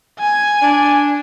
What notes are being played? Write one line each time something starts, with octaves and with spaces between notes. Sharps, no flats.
G#5
D4